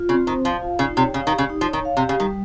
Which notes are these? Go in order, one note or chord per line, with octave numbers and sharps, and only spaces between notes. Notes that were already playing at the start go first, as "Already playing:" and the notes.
Already playing: F4
C#3 C4
D#3 C5
F3 F5
F4
C#3 D#4
C3 C#5
C#3 F5
D#3
G4
C#3
D#4
F3
C#5
D#3
F5
C3
G4
C#3
D#3 G3